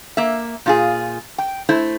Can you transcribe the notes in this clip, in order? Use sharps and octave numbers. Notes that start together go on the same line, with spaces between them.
A#3 E5
A#2 F4 G#4
G5
A3 E4 C5